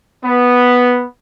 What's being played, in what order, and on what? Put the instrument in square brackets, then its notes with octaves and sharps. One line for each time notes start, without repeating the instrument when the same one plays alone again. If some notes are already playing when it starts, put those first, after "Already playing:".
[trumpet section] B3